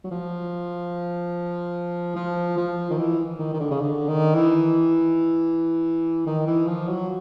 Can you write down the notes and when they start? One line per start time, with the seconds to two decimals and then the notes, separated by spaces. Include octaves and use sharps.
0.04 F#3
0.11 F3
2.16 F3
2.57 F3
2.90 D#3
2.98 E3
3.39 D#3
3.53 D#3
3.59 D3
3.71 C#3
3.80 D3
4.08 D#3
4.35 E3
6.26 D#3
6.47 E3
6.67 F3
6.88 F#3